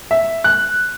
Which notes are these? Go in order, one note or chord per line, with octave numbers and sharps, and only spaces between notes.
E5
F#6